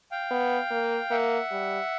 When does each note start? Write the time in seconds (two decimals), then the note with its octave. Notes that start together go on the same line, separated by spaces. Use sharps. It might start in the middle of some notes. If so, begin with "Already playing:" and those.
0.11 F5 G5
0.31 B3
0.71 A#3
1.11 A#3 E5 F#5
1.51 G3